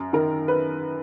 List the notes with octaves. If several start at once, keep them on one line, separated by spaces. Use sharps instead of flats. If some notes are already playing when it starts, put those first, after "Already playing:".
Already playing: F#2
D#3 A#4
B4